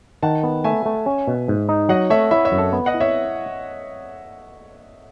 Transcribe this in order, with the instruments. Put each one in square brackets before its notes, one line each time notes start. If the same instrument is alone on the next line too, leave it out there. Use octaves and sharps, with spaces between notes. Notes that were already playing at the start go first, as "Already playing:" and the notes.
[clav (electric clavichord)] D#3 [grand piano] F#5 A5
[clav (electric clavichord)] B3
[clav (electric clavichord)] A3 [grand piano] E5 G#5
[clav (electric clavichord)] A3
C#4
B2
G#2
D#4
[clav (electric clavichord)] F#3 [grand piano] D#5 F#5
[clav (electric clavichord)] A3 [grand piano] C#5 E5
[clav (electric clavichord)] E4 [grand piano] C#5 E5
[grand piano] C#5 E5
[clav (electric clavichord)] F#2
[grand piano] A4
[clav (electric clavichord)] B3
[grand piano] D#5 F#5
[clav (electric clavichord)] E4
[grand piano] C#5 E5